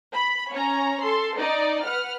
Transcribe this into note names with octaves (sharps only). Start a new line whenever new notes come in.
B5
C#4 C#5 A#5
A4 C6
D#4 D5 D#5
B4 F#5 F6